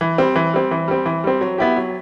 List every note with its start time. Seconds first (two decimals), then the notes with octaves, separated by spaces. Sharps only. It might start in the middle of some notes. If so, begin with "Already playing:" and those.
0.01 E3
0.18 G3 C4
0.36 E3
0.53 G3 C4
0.71 E3
0.88 G3 C4
1.06 E3
1.24 G3 C4
1.41 F#3
1.58 B3 E4 G4
1.76 F#3